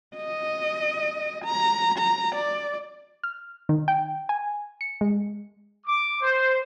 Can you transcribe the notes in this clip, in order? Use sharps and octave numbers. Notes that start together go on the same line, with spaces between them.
D#5
A#5
A#5
D5
F6
D#3
G5
G#5
C#7
G#3
D6
C5